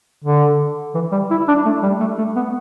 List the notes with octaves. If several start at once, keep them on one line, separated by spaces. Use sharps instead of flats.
D3
E3
G3
E4
D4
A3
G3
A3
A3
B3